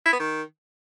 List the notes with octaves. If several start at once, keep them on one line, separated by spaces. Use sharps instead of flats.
E4
B3
D#3